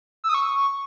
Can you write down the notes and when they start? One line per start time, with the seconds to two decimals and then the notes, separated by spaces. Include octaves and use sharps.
0.24 E6
0.29 D#6
0.34 C#6